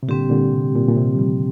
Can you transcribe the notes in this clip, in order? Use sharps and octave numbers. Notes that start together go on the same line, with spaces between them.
C3
A#2 D3 G3 C4 G4
A#2 D3
C3
A#2
A#2
C3
F3
D#3 G3